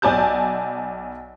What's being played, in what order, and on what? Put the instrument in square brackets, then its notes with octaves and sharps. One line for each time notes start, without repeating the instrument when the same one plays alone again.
[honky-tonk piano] B1 D5 G#5 A5 G6